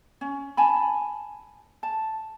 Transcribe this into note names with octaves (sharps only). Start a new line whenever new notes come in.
C#4
G#5 A5 B5
A5